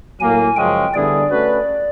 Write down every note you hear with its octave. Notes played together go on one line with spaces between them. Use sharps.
A2 F#3 A#3 G#5
F#2 C#3 F3 G#3 C#4 G5
D3 G3 B3 E4 G#4 D5
A3 C#4 F#4 B4